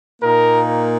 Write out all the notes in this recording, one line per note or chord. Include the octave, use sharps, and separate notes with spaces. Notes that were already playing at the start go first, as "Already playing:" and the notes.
A#2 A#3 D#4 A#4